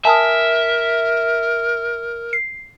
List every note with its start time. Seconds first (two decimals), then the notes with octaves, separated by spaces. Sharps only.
0.05 A#4 E5 G#5 A5 D#6
2.33 C7